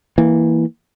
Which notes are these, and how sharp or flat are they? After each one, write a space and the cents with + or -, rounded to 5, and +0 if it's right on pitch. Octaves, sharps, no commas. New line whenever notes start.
E3 -5 A#3 +0